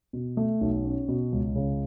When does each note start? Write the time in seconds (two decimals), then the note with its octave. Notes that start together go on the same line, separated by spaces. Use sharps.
0.13 B2
0.37 A3
0.61 B1
0.84 C#4
1.08 B2
1.32 C#2
1.55 C#3